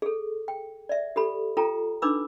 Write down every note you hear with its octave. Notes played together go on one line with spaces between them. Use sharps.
G#4 A4
G5
D5 E5
G4 A4 B5
F4 A4 G5 A#5
D4 D#4 B4 B5 D6 E6